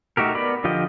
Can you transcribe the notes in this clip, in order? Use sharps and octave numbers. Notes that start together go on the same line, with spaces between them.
A3 D#4 F#4 G4 A#4
B3 A#4 D5 B5
D3 F3 F4 G4 D#5